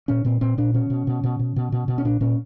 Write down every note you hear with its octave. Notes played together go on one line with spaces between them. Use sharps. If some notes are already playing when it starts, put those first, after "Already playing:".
A#2 C#4
A#2 C4
A#2 C4
A#2 D4
B2 C#4
B2
B2
B2
B2
B2
B2
B2
C#4
A#2 D4
A#2 C#4